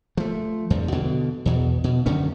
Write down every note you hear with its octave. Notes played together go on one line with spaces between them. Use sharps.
F3 A3
E2 G2 F3
B2 D3
E2 B2
B2
F#2 D3 D#3 C#4